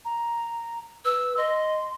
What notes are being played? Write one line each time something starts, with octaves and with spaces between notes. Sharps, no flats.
A#5
B4 E6
D#5 C6